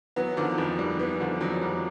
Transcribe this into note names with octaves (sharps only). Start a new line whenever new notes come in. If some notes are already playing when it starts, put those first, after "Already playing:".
E3 F#3 B3
D3 D#3 F3
F2 E3
D#3 G3
E3 B3
D3 D#3 F3
F2 E3 F#3
D#3 F3 G3